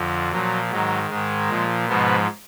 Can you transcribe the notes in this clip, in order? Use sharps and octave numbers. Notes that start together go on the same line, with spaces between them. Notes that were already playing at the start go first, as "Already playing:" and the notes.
Already playing: F2 D3 F3
A#2 F3 F#3
G#2 D#3 F#3
G#2 D#3 G#3
A#2 F3
G#2 B2 F3 B3